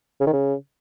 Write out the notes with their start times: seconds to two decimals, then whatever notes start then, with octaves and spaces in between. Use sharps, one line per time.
0.21 C#3
0.27 D#3
0.33 C#3